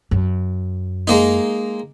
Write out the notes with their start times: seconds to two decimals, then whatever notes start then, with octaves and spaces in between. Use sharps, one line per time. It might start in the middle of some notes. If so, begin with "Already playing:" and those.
0.11 F#2
1.07 G#3 A#3 D#4